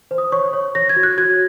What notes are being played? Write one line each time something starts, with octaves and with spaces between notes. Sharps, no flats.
C5
D#6
C#5 C#6
C#5
C#5 A#6
G#6
F#4
F#6
F#4 G#6